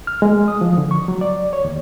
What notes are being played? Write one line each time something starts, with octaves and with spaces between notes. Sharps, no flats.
F6
G#3
D#6
F3
D3
C#6
F#3
D5
C#5
D#2